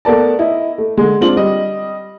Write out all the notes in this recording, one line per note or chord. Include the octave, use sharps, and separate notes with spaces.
A3 B3 A#4 D5 A5
E4 D#5
A3
D3 G#3
G#3 C4 D4 F4 F#7
G3 D#5